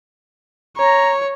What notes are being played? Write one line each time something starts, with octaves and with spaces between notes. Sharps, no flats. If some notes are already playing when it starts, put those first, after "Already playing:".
C#5 A#5